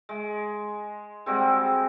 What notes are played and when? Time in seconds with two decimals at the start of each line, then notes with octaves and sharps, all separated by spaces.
0.09 G#3
1.26 G3 G#3 C4 F#4